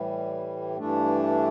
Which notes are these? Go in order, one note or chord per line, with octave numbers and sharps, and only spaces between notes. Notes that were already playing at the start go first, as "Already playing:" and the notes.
Already playing: A2 E3 G3
G2 E3 A3 D4